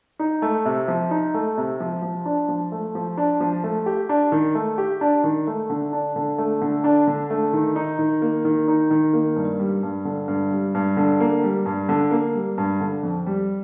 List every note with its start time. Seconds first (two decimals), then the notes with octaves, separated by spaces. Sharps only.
0.19 D#4
0.42 A3
0.65 C3
0.88 F3
1.11 D#4
1.34 A3
1.57 C3
1.80 F3
2.02 F3
2.26 D4
2.48 F3
2.72 A3
2.95 F3
3.17 D4
3.40 F3
3.64 A3
3.86 G4
4.09 D4
4.32 D#3
4.55 A3
4.78 G4
5.01 D4
5.24 D#3
5.47 A3
5.70 D3
5.93 D4
6.16 D3
6.38 A3
6.61 D3
6.84 D4
7.07 D3
7.30 A3
7.53 D#3
7.76 D#4
7.99 D#3
8.22 A#3
8.45 D#3
8.68 D#4
8.91 D#3
9.13 A#3
9.36 G2
9.59 G3
9.83 G2
10.05 D3
10.28 G2
10.51 G3
10.75 G2
10.97 D3
11.20 A#3
11.43 G3
11.66 G2
11.89 D3
12.11 A#3
12.35 G3
12.58 G2
12.81 D3
13.03 F2
13.26 G3